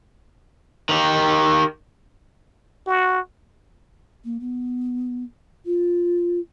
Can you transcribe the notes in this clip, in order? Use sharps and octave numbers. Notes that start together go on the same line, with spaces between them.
D#3 G4
F#4
A#3
B3
F4